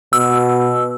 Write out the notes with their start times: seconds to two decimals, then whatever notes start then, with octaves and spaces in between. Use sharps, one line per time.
0.13 B2 E6